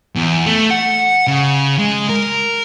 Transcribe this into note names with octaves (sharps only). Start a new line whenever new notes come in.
E2
A3
F#5
C#3
G#3
A#4